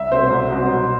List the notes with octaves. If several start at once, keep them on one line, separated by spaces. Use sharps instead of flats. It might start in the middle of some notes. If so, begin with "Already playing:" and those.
Already playing: C2 E5
B2 A3 C4 C5
C2
B2 F#3 C4
B2